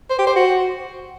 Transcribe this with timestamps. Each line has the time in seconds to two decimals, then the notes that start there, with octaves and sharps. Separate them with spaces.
0.10 C5
0.19 G4
0.27 C5
0.36 F#4